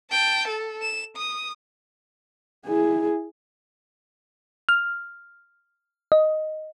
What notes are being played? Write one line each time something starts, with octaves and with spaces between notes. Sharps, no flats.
G5 A5
A4
E7
D#6
E4 G#4
F6
D#5